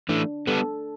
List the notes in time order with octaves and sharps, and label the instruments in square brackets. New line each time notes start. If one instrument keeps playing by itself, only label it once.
[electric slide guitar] E3 A3 [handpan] D4
[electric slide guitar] G3 B3 [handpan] A4